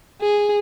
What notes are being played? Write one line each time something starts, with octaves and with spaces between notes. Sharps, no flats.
G#4